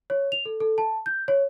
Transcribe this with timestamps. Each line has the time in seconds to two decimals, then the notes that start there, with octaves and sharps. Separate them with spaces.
0.10 C#5
0.32 F7
0.46 A4
0.60 A4
0.78 A5
1.06 G6
1.28 C#5